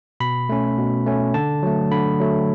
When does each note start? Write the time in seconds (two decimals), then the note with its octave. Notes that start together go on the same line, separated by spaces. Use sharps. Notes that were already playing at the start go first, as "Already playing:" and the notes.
0.20 B2 B5
0.49 A3 C#4
0.78 B2
1.06 A3 C#4
1.34 D3 A5
1.63 F#3 A3
1.91 D3 B5
2.20 F#3 A3